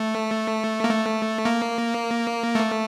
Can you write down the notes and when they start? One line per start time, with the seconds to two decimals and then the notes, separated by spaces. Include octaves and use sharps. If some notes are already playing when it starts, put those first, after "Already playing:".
Already playing: A3
0.84 A#3
0.89 A3
1.45 A#3
2.55 A3